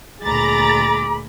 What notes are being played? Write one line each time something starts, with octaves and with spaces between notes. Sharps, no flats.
D2 A#2 G#4 A#5 B5 D6 A6